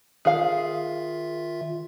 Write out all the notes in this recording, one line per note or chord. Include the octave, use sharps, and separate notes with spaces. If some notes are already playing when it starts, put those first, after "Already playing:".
D#3 F4 G#4 E5 F5